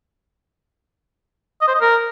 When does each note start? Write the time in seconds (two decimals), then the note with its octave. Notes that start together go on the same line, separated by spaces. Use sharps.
1.61 D#5
1.68 C5
1.74 D#5
1.81 A#4